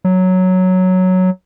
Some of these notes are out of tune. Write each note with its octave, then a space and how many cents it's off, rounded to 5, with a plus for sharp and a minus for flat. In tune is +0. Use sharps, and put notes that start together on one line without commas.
F#3 +0